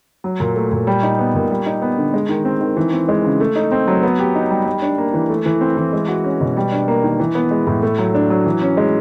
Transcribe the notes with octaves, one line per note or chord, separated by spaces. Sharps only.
F#3
A#2
A3
A#2
G3
D#4
B3
A#2
G3
D#4
B3
D3
G#3
D#3
C4
D#3
E3
C4
G#3
C#3
A3
D#4
C4
F#3
B3
G4
D#4
G3
G3
D4
A#3
E3
A3
E3
C4
E3
G#3
F#4
C#4
B2
G3
D4
A#3
D#3
E3
B3
G#3
A2
A3
F#3
D4
F#3
E3
C#4
G#3